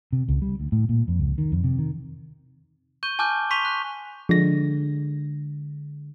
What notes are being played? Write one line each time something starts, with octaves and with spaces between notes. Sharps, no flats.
C3
C#2
G3
D2
A2
A#2
F2
C#2
D#3
F2
C3
D#3
C#6 G6 D#7 G7
G#5 A5 D6 F6 G6
C6 C#6 B6 D#7 F7 G7
F#6
D3 F3 G#3 A#6